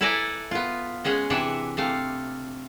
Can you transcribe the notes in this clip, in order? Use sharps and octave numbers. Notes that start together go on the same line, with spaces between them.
E4 A4 B4 D5 G#5 A#5
B3 F4
G#3 C#4 G#4 F#5
C3 E3 D4 E5 F#5
C3 A3 F5